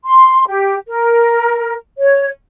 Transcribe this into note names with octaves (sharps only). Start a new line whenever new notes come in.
C6
G4
A#4
C#5